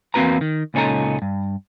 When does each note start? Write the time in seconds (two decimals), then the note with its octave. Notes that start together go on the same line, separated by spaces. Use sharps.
0.14 E2 A#3 C4 F#4 B4 A#5
0.41 D#3
0.74 C#2 A#2 C#4 D#4 A4 A#5
1.22 G2